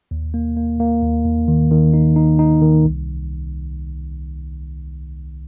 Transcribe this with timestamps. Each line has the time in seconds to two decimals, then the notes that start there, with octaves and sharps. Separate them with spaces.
0.11 D#2
0.34 A#3
0.57 A#3
0.80 A#3
1.02 D#2
1.25 D#2
1.48 D#3
1.71 D#3
1.94 D#4
2.16 D#4
2.39 D#4
2.61 D#3
2.85 C2